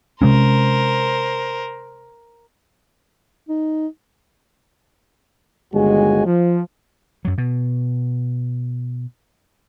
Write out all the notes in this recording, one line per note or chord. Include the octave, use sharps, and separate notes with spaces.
C3 G#3 C#4 A#4 C5
D#4
G1 D#2 G#3 F#4 G#5
F3
F#2 F#3
B2